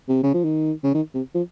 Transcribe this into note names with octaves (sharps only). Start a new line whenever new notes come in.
C3
C#3
F3
D#3
C#3
D#3
C3
F3